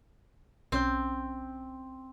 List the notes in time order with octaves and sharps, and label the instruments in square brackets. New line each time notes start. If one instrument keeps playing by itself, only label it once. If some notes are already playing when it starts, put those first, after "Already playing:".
[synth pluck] B1 C#4 G6 [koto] C4